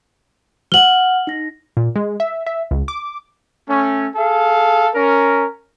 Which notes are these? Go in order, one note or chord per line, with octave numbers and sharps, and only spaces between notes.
F#5 F6 F#7 G7
D#4 A#6
A#2
G#3
E5
E5
C#2
D6
A3 C#4
G#4 A4 F5
C#4 A#4